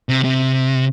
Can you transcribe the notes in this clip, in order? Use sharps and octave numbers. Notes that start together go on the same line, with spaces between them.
C3
C3